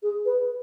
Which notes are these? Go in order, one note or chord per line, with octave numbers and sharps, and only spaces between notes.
G#4
B4